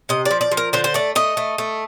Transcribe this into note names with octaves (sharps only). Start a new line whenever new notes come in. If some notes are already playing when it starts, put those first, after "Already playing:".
C3 D#5
D5
F3
D5
F3
A#4
D3 C5
C5
A3 D5
A3 D#5
A3
A3